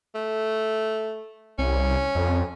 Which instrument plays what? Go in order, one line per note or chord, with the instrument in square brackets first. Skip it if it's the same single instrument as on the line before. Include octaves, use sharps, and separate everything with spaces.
[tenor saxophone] A3
[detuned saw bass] C2 [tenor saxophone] C#4
[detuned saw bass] F2